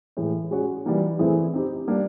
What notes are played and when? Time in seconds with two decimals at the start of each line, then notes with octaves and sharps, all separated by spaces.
0.17 A2 E3 G#3
0.51 G#3 C#4 F#4
0.86 E3 G3 A#3 D#4
1.19 E3 A3 C4 E4 G#4
1.54 C4 D#4 G4
1.88 G3 A#3 D4